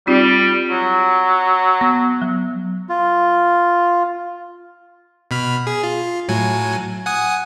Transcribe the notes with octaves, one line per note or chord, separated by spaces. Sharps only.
G3 C4 D#4 F4
F#3
B3
F#3
F4
B2 B5 F6
G#4
F4
A2 F#3 G#5
F#5 G#5 D#6